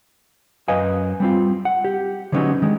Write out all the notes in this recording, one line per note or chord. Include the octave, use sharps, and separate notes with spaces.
F#2 B4 D#5 F5 G#5
G3 C4 F4
F#5
G4
D3 F#3 A3 B3 C#4 D#4
D#3 G#3